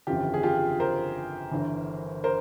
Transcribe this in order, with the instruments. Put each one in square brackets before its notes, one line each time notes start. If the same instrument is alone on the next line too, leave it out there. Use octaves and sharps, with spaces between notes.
[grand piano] G1 F2 C#3 E3 F4 G4
G#4
F4 G4
A#4 C5
G1 G2 E3
A#4 C5